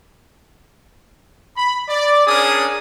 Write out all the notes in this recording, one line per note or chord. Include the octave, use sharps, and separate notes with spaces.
B5
D5
C#4 D4 G#4 A#4 D#6